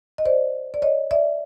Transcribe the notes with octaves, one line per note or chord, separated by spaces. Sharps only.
D#5
C5 D5
D5
C#5 D#5
D5 E5